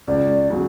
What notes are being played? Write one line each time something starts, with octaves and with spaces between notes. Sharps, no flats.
C#2 D5
C#3 F#3